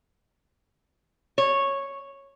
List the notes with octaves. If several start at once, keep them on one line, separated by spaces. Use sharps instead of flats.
C#5